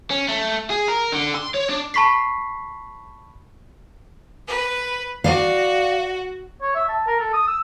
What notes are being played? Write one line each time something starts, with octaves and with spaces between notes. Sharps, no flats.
C#4
A3
G#4
A#4
D3
C6
C#5
D4
A5 B5 C#6 B6 C7
B4
F#4 D5 F5
C#5
E5
A5
A#4
A4
D#6
E6